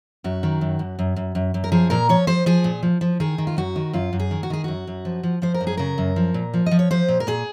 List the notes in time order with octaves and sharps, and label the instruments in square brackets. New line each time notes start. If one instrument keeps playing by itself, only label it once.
[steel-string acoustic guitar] F#2 F#4
D#3
F#2
F#2
F#2
F#2
F#2
F#2
A#4
F3 G#4
A#2 A#4
F3 C#5
F3 C5
F3 G#4
A#2
F3
F3
D#3 G#4
D#3
F4
F#2 F#4
D#3
F#2 F4
F#2
G#4
D#3
F#4
D#3 G#4
F#2 F#4
F#2
F3
F3
F3 C5
A#4
F#2
G#4
C#3 A#4
F#2
F3
A#2
F3
F3 D#5
C#5
F3 C5
A#2
A#4
A#2 G#4